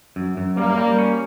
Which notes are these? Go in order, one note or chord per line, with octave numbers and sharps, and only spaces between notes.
F#2
F#2
G3 A#3
G3
C#4